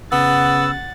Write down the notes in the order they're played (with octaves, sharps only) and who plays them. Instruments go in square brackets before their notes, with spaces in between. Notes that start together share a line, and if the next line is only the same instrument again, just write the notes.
[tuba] C#3 [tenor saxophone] B3 [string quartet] F#5 A6 [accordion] E6